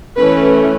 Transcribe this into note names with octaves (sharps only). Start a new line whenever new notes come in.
E3 A3 C#4 B4